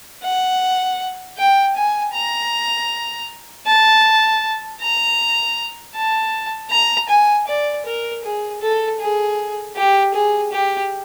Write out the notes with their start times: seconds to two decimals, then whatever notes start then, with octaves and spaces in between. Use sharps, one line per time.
0.23 F#5
1.38 G5
1.76 G#5
2.14 A#5
3.66 A5
4.80 A#5
5.95 A5
6.71 A#5
7.09 G#5
7.47 D5
7.85 A#4
8.24 G#4
8.62 A4
9.00 G#4
9.76 G4
10.14 G#4
10.52 G4